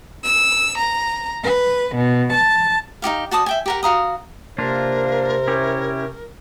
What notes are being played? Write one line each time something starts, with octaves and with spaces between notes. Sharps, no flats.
E6
A#5
B4
B2
A5
D#4 F#4 G4 F5
F#4 D5 A5 D#6
E5 G5 G#5
G4 A#4 F#5
F#4 F5 A#5 D#6
C3 A#3 D4 F4 A#4 C5
C#4 E4 G4